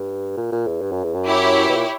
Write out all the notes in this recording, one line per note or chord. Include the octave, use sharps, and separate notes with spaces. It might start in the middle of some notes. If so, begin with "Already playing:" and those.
Already playing: G2
A#2
A#2
E2
G2
F#2
E2
F#2
E4 G4 C#5
B2
A#2